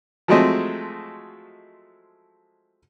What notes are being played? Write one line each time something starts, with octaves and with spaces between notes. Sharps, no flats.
F3 F#3 G#3 A3 C4 D#5